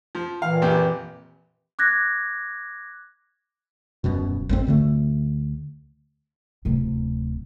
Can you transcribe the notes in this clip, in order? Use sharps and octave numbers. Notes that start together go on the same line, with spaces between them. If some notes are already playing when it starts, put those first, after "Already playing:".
F3
A#2 D#3 E3 F5
A#1 F2 G4
D6 F#6 G#6 A#6
D#1 F#2 B2
G#1 F2 C4
D2 D3 A3
D1 C3